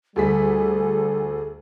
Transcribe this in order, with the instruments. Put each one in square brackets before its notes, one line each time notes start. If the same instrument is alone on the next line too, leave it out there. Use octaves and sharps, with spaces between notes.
[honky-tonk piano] D2 G#4 B6 [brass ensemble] G3 [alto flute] A4